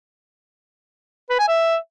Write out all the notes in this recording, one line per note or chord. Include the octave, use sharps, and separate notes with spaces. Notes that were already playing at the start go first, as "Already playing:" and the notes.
B4
G#5
E5